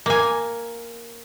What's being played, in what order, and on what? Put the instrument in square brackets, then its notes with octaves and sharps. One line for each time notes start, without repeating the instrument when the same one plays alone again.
[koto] A#3 G#5